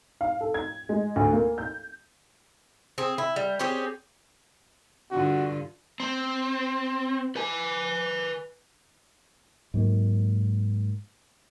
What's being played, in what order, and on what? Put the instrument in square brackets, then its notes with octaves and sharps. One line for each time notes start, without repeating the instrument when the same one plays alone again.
[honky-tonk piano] F5
A4
G#6
G#3
D2
A#3
G6
[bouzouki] C4 G#4
E4
G3
C4 C#4 G4 G#4
[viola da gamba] G2 D3 F4 [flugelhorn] F#4
[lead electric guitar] C4
B4 G#5
[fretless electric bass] G#2 F#3 A#3